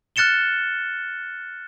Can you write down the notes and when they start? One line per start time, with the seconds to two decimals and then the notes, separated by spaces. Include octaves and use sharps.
0.16 F6 F#6 A6 C#7 E7 G7